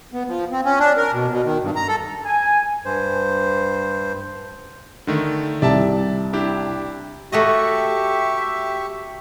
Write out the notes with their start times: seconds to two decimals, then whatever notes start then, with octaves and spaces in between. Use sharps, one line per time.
0.13 B3
0.28 F3
0.52 C4
0.65 C#4
0.80 D4
0.97 A#4
1.13 B2
1.29 B2
1.45 D#3
1.62 G2
1.76 A#5
1.88 A4
2.25 G#5
2.85 G2 C5
5.07 D3 D#3 A3
5.62 C2 D5 E5 A5
6.33 D4 E4 G4
7.32 A3 F#4 G4 D#5 E5 C#6